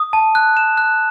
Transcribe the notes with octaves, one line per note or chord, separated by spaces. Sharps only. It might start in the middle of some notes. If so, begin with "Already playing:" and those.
Already playing: D#6
A5
F#6
E7
F#6